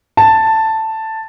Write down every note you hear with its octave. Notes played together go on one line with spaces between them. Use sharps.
A5